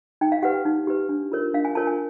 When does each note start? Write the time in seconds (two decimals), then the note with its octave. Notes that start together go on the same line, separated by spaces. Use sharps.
0.21 D#4 G5
0.32 F5
0.43 G4 B4 F#5
0.54 G5
0.65 D#4
0.87 G4 B4
1.09 D4
1.32 F4 A#4 C#5
1.54 D4 F5
1.65 G#5
1.75 F4 A#4 C#5 A5
1.87 G#5